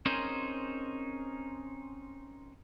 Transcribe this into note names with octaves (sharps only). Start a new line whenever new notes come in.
C4 C#4 D#4 G#4 A#4 C5